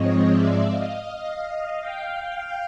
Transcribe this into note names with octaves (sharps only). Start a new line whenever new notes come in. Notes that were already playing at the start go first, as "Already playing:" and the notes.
Already playing: G#2 F3 G#3 C4 C#5 D#5
D5 E5
D#5 F5
F5 G5